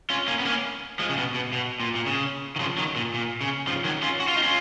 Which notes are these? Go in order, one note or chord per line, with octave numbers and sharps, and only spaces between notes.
C#4 F4
A#3 C#4
B3
A#3 C#4
F3 G#3
C#3
B2
B2
B2
A#2
A#2
C#3
D#3
C#3 F3
D#3 F#3
A#2
A#2
C#3
C#3 F3
D#3 F#3
C#4 F4
F#4
F4
D#4
C#4 F4